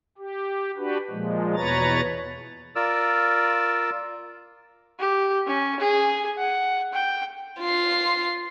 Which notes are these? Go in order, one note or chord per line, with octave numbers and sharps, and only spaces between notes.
G4
D4 F#4 G4 B4
A#2 F3 G#3
E2 B2 B4 C#5 A#5 A6
F4 A#4 D5 E6
G4
C#4
G#4
F#5
G5
F4 C7